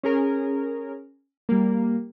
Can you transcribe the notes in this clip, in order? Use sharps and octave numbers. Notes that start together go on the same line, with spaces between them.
C#4 G#4 A#4
G3 A#3